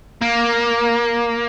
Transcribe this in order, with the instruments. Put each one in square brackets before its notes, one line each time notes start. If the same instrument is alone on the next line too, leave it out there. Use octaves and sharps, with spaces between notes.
[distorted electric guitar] A#3